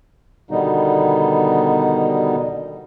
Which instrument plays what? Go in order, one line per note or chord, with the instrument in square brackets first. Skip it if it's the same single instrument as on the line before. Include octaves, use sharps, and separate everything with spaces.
[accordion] B2 D3 D#3 G3 B3 D#4